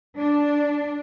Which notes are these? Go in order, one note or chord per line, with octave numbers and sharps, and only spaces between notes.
D4